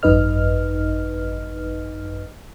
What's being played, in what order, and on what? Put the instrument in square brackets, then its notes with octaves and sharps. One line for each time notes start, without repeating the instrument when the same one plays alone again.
[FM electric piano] G#1 F#2 D#4 B4 D#5 F6